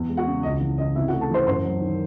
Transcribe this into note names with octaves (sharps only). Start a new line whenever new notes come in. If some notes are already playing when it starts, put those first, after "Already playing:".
Already playing: E2
G#3
F#4 F#5
C#3
C#2 D#5
E3
C#3 D#5
C3 E4 E5
F#4 F#5
A3
A4 A5
E3 C5 C6
F#2 C5 C6
F#3
D#3